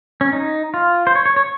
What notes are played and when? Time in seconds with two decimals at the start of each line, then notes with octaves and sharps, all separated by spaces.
0.21 C#4
0.33 D#4
0.74 F4
1.07 C5
1.15 C#5
1.26 C#5
1.36 C#5